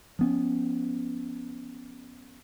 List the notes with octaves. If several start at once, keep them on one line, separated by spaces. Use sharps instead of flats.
F3 B3 C#4